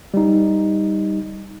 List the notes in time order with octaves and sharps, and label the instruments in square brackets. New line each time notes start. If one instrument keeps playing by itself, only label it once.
[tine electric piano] G3 D#4